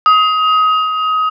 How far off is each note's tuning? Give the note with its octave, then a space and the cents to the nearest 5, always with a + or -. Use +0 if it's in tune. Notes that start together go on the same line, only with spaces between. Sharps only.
D#6 +25